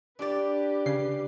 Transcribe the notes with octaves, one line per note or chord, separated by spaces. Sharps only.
D4 G4 B4 D5
C#3 C7